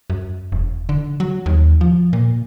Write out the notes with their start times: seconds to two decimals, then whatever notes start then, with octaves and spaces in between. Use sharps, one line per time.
0.10 F#2
0.52 E1
0.89 D3
1.20 F#3
1.46 D#2
1.81 F3
2.13 A#2